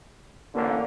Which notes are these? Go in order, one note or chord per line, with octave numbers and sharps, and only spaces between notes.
A1 D3 A#3